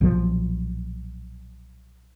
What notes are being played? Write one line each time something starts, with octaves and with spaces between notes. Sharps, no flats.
B1 A#2 D3 F3